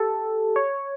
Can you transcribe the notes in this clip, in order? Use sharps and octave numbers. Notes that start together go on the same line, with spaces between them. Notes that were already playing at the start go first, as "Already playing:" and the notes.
Already playing: G4 A4
C#5